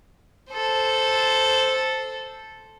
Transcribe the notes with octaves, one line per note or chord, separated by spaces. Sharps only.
A4 C5